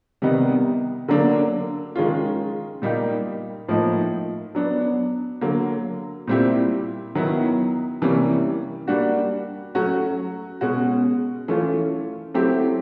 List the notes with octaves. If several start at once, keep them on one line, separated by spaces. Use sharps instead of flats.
C3 D#3 G3 B3 D#4
D3 F#3 A#3 D4
D#3 G#3 C#4 F4
A#2 G3 A#3 D#4 G4
A2 F3 A#3 D#4
F#3 B3 D4
D3 F#3 A#3
A#2 G3 C4 E4 G4
D#3 F#3 B3 E4
C3 E3 G3 A#3 C#4
G3 A#3 D4 F#4
F#3 A3 C#4 F#4
B2 G#3 C#4 F#4
E3 A3 C#4 F4
F#3 A3 C4 E4 G4